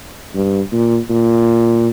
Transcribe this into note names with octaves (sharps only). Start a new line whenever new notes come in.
G2
A#2
A#2